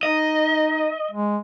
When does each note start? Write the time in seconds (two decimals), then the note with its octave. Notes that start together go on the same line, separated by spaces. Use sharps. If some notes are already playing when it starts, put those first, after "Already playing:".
0.03 D#4 D#5
1.11 G#3